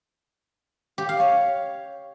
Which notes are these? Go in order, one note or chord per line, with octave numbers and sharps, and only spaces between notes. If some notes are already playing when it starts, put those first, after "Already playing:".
G4
F5
C#5